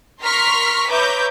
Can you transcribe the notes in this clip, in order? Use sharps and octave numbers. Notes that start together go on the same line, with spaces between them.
A#4 A#5 C6 C#6 F6 B6
B4 C#5 E5 A#5 D6 G6